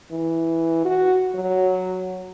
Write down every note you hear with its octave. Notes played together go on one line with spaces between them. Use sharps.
E3
F#4
F#3